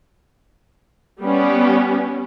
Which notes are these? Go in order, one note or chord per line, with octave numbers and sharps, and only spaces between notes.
G3 B3 C#4